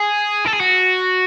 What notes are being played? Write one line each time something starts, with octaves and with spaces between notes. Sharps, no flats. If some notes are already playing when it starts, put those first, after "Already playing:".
Already playing: G#4
A4
G#4
F#4